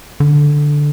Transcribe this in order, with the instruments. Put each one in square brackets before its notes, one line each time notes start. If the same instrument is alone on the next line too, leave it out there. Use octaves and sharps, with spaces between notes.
[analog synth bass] D3